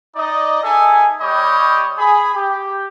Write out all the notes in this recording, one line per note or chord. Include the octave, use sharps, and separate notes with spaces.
D#4 D5 D#5
D#4 G#4 A4 E5 G#5
G3 C#5 D#5 G5 B5 D6
G#4 B5
G4